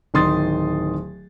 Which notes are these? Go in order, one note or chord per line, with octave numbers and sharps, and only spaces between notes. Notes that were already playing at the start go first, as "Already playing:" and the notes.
D1 D#3 C6 D#6 A6